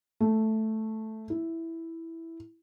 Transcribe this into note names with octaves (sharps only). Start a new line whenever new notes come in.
A3
E4